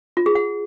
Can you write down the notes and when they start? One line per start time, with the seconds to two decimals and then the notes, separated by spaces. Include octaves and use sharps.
0.17 F4
0.26 G#4
0.35 F#5